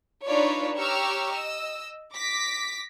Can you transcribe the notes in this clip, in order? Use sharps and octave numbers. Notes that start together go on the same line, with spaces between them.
D4 D#4 F4 B4 C#5 D5
G4 C#5 A#5 C#6 E6 F6
D#5 E6
D6 A#6 B6